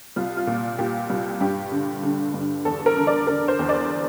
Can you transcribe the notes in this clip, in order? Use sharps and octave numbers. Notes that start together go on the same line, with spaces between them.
C2 F4
F4
A#2
A#2 G4
C2
G2 G4
D3
D3
G2
E2 A4
A#4
D3
D5
D3 A#4
C5
E2
D5